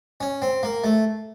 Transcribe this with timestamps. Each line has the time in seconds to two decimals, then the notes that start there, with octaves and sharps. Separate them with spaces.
0.21 C#4
0.42 C4
0.63 A#3
0.84 A3